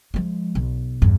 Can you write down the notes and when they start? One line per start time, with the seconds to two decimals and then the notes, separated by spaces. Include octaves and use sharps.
0.14 F3 G#3
0.55 B1
1.02 E2 G2